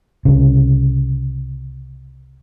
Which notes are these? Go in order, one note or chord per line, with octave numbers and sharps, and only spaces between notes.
C2 C#3